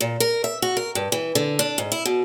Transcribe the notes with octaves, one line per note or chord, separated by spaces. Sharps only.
A#2
A#4
E5
F#4
A#4
G2
E3
D3
D4
G#2
E4
B2